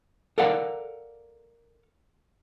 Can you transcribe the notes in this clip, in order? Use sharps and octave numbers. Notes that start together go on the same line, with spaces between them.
A4 A#4 D5 F5 F#5